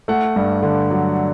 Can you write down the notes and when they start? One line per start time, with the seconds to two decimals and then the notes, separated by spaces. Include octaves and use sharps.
0.08 A3 F#5
0.36 G2
0.62 D3
0.90 F#3